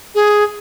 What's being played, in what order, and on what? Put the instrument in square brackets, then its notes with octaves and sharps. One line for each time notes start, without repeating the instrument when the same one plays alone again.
[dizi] G#4